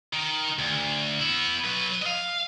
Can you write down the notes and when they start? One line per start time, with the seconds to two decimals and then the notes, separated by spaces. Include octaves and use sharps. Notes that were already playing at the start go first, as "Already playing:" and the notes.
0.13 D#3
0.59 D2
1.19 B3 E4
1.65 F#3 B4
2.02 D#5 F5